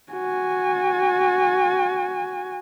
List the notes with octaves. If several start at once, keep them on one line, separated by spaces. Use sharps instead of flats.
F#4 G#5